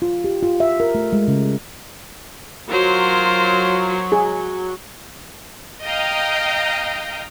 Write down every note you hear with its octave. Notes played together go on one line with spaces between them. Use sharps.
F4
G4
F4
E5
A#4
A3
G#3
C#3
F#3 F4 A#4 C5
G#4
D#5 F5 G5 A#5